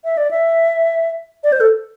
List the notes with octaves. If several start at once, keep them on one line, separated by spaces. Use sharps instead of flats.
E5
D5
E5
D5
C5
A4